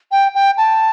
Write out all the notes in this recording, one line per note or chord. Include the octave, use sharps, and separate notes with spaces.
G5
G5
A5